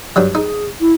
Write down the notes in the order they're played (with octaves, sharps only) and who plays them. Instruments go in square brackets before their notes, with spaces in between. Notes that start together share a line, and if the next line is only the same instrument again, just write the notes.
[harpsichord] G2 F#3 G3
[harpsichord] D#4 [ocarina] G#4
[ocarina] E4